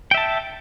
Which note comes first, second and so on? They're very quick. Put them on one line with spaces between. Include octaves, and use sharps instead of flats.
G5 E5 A5